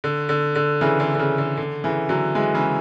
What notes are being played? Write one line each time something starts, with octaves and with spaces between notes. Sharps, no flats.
D3
D3
D3
C#3 E3
D3
D3
C#3
D3
D3
C#3 E3
D3 F#3
E3 G#3
C#3 E3